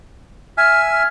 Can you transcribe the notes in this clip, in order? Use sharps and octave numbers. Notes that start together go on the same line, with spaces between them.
E5 G#5 F6
F6